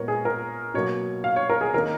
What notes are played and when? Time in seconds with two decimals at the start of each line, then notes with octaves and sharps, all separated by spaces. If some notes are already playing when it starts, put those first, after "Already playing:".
Already playing: A#2 G#3 B3 A#4 C#5
0.08 G#4
0.25 A#4
0.74 B2 F#3 A#3 C#5
1.24 F5
1.36 C#5
1.50 A#4
1.61 G#4
1.74 D#3 A#3 A#4